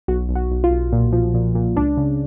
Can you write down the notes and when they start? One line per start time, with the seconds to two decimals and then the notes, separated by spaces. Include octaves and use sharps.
0.08 B1 F#4
0.29 B1
0.35 F#4
0.51 B1
0.64 F4
0.71 B1
0.93 A#2
1.13 F3
1.34 A#2
1.55 A#2
1.76 C#2 D4
1.97 C#3